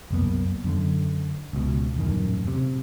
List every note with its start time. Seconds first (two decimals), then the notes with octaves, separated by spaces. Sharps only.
0.11 C2 F#2 A#3 B3
0.64 F#2 D3
1.53 C#2 B2
1.97 D#1 A1 F#2 D#3
2.47 C3